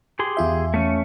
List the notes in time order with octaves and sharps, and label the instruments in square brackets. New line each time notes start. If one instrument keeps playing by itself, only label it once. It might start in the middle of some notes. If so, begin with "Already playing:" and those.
[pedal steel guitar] G4 G#4 C6
[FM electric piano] E2 F4 E5
[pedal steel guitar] A3 C#4